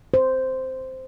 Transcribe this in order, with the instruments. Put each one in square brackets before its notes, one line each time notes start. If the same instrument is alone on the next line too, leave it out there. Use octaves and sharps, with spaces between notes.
[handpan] C5